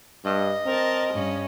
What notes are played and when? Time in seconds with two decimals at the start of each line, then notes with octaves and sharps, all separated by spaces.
0.25 G2 D#5
0.66 C4 A#4 A5
1.12 G2 C#4